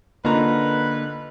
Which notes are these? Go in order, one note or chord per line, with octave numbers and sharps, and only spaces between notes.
D3 A#3 D#4 F4 B4 A#5